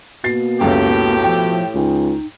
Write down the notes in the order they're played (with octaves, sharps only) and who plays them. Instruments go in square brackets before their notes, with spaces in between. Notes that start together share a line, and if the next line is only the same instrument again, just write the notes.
[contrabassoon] B2 [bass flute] A#3 [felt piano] A6 C7
[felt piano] C#2 F#2 [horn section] A2 G4
[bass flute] F3 [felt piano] G5
[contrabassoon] C#2 [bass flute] D#4